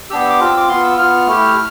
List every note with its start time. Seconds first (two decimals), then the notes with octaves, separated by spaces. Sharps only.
0.10 B3 D4 G4 E6
0.20 E6
0.30 D6
0.40 C4 F4
0.46 E6
0.57 D6
0.69 B3 F4 C6
0.84 E6
0.98 B3 F4 F6
1.27 A3 E4 G4